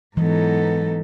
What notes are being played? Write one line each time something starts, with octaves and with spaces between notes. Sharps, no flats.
G#2 E3 F#3 B3 D#4 A4